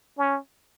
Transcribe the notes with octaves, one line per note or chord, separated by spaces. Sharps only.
C#4